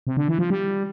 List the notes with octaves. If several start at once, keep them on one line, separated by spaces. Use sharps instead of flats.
C3
D3
E3
F3
G3